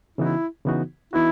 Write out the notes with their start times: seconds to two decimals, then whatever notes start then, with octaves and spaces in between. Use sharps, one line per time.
0.18 C#3 E3 B3 D#4 E4 F#4
0.65 C#3 E3 B3 D#4 F#4
1.13 E3 B3 D#4 E4 F#4